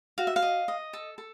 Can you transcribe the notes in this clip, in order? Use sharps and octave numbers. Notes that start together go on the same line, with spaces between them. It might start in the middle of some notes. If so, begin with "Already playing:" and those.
F#4 F5
E5
F5
D#5
D#5
A4
A4